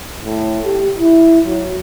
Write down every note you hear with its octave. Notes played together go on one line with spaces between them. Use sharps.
A2
G4
E4
F#3